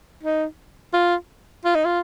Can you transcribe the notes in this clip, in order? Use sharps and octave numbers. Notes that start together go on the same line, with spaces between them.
D#4
F4
F4
D#4
F4